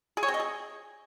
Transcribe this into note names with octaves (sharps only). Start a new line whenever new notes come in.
G#4
C#5
C4
D#5
G#4